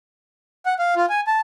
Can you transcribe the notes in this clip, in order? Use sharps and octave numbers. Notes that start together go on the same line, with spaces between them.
F#5
F5
F4
G#5
A5